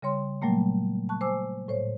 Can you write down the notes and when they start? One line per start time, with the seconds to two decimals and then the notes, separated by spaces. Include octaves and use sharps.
0.02 C#3 G3 C#5 C6
0.42 A#2 F#3 G3 A3 A#3
1.09 A5 C#6 F#6
1.21 C5 G#5 D6 E6
1.68 A2 C5 C#5